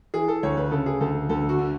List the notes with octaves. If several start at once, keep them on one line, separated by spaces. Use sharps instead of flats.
E3 G#4
A4
D2 C#5
B4
C#3 A4
G#4
D2 A4
D2 A4
F#4
D3